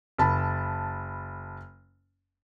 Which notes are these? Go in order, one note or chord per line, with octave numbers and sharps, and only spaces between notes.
F#1 A5 B5